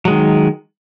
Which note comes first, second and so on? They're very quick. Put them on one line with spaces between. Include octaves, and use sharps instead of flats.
F#3 G#3 D#3